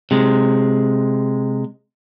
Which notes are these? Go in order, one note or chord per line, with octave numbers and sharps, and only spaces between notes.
C3 G#3